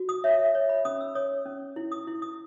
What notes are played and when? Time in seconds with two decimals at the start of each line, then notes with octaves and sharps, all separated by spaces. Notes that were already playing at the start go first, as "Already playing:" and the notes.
Already playing: F#4
0.09 D#6
0.24 C#5 E5
0.39 E5
0.55 C#5
0.69 B5
0.85 C#4 D#6
1.00 E6
1.15 C#5 D#6
1.46 C#4
1.76 E4
1.92 D#6
2.07 E4
2.22 D#6